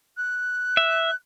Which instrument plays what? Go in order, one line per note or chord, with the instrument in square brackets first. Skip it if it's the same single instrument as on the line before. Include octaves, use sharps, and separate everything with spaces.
[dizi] F#6
[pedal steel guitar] E5